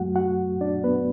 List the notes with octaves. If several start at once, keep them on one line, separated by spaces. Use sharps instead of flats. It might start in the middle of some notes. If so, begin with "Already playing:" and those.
Already playing: F#2 F#3 A3 F#4 F#5
F#4 F#5
D4 D5
B3 B4